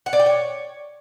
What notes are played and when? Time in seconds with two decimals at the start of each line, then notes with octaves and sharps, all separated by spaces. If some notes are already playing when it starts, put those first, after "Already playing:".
0.06 F#5
0.13 D5
0.19 G5
0.26 C#5